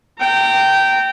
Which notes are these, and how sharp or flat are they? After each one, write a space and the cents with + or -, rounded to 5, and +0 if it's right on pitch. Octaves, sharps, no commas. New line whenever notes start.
G5 -15 A#5 -30